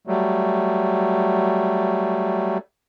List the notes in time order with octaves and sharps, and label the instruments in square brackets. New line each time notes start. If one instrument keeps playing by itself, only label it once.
[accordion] F#3 G3 A3